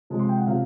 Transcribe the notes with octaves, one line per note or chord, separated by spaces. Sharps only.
C3 F3 G#3
C6
G5
F#5
C3 F3 F5